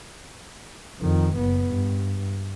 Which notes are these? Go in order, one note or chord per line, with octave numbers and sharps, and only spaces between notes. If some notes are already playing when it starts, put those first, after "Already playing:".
F2 D#3
F#1 B3
G2